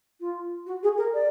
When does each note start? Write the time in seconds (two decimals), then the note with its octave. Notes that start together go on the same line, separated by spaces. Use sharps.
0.20 F4
0.66 F#4
0.83 G#4
0.97 A#4
1.14 D5